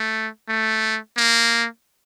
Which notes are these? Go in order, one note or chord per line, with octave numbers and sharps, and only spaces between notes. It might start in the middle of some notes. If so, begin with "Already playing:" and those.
Already playing: A3
A3
A#3